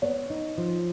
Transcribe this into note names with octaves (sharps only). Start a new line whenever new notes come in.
B3 C#5
D#4
F3